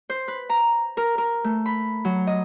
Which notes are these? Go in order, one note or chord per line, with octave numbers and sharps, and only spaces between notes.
C5
B4
A#5
A#4
A#4
A3
B5
F#3
D#5